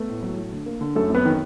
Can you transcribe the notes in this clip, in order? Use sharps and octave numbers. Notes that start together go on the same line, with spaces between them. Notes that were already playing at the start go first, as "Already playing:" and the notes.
Already playing: A3 B3 A4
A2
F#3
F#3
D3
A#3
D3
F#2 A3 A4
F#2 B3 B4
D#3